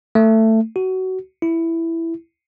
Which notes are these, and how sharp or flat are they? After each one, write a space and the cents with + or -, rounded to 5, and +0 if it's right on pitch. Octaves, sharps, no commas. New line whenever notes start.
A3 +15
F#4 +20
E4 +5